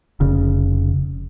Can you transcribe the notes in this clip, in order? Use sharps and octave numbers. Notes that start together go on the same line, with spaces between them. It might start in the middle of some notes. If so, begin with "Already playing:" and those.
F1 C#3